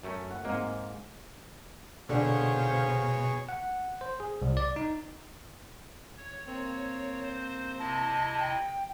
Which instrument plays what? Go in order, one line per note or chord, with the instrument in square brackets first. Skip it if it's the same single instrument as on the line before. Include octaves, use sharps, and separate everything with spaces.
[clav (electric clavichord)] F#2 A3 C#4
[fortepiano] F#5
[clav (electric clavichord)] G#2 A#3 [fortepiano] G#3 C4
[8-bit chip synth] B2 [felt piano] D3 D4 [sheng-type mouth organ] G#4 C#5 C#6 [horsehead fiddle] C5 F5
[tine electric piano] F#5
C5
G#4
C2
D5
D#4
[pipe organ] C#5
[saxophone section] A#3 C4
[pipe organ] C5
[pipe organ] C3 E4 D#5 [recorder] A5
[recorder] G5